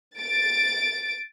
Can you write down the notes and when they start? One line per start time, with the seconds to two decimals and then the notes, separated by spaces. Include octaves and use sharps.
0.19 A6 D7